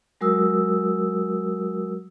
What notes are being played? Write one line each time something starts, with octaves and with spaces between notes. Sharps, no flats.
F#3 G#3 F#4 A#4 D#6 E6